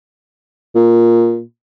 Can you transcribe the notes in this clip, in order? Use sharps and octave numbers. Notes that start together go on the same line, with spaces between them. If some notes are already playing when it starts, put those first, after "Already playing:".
A#2